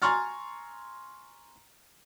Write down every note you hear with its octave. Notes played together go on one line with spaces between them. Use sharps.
G#5 A#5 C6 C#6 F6 A6